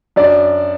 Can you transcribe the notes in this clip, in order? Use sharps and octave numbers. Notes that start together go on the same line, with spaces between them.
F#2 D4 D5